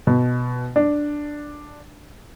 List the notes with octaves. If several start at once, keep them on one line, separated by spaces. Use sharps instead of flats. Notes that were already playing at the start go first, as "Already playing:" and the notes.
B2
D4